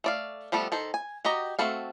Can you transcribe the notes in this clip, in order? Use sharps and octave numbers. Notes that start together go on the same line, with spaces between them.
A3 D5 F5
F3 G3 A3 B3 A4
D#3 A4 C5
G#5
F#4 G4 D#5 A#5
A3 C4 F#4 A4 F5